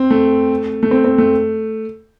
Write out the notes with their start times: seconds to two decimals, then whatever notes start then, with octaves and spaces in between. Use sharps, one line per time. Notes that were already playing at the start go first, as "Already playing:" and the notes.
Already playing: C4
0.11 A3
0.83 A3
0.91 C4
1.04 C4
1.18 A3